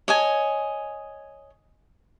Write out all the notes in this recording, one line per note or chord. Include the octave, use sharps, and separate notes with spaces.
C#5 D#5 G#5